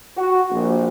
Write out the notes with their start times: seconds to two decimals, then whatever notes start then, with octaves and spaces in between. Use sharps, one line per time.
0.17 F#4
0.51 A#1